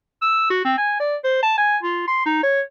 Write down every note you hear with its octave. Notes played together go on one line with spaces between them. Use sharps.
E6
F#4
C4
G#5
D5
C5
A5
G#5
F4
C6
D#4
C#5